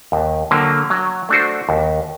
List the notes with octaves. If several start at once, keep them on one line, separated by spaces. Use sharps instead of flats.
D#2
D3 F#3 A#3
F#3
A3 D4 F#4 C5
D#2